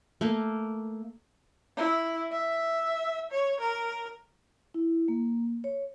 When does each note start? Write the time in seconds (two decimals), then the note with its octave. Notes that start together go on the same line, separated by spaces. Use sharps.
0.21 A3 A#3
1.77 E4
2.32 E5
3.31 C#5
3.60 A#4
4.74 E4
5.08 A#3
5.64 C#5